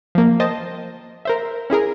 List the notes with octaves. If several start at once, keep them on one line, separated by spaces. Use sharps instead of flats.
F3 A#3
C5 D#5 G5 A5
A#4 C5 E5
C#4 E4 G#4 A#4